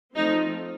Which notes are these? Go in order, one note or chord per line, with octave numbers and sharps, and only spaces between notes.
F3 A3 C4 D#4